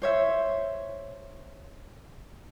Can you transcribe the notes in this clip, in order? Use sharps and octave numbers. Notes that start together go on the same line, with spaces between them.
C5 C#5 E5